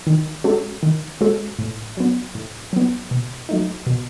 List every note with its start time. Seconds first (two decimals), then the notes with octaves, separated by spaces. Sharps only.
0.07 D#3
0.44 G#3 C#4 F#4 A4
0.83 D#3
1.21 G#3 C#4 F#4 A4
1.59 A2
1.97 F#3 B3
2.35 A2
2.73 F#3 B3
3.11 B2
3.49 F#3 A3 D#4
3.87 B2